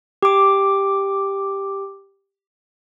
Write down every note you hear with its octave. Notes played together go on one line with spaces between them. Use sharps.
G4 D6